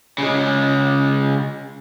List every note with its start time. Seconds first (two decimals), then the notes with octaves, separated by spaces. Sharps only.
0.18 C#3 G#3